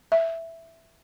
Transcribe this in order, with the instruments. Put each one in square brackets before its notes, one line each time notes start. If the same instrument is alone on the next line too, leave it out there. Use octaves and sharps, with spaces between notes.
[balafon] E5